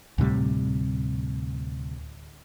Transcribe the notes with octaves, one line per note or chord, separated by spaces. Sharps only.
D2 A2 C3 G3